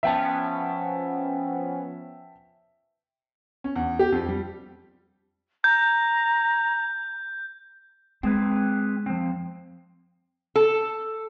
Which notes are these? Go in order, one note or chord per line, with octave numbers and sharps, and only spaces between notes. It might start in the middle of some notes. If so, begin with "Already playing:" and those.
F3 B3 C#4 E5 G5 A5
C#4
E2
G4
F2
G3
A#5 G6
G#3 C4 G#4 B4
F3 C4
A4